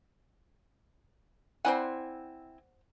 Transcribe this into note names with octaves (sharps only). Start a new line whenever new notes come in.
C4 E4 C5 D5 F#5 G#5